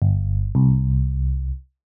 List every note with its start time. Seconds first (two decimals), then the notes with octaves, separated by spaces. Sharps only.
0.02 G1
0.55 C2